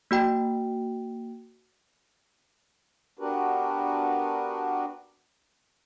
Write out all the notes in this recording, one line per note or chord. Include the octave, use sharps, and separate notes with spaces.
A#3 F#4 G5
B3 D4 F#4 G4 A#4 B4